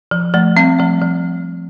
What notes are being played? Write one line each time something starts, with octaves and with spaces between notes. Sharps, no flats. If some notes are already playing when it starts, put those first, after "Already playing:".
F3
F3 A3
G3 C4
F3 A3
F3